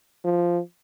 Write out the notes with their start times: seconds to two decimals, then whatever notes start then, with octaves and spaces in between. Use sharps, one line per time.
0.24 F3